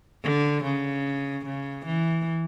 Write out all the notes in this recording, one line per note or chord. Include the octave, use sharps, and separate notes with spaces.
D3
C#3
C#3
E3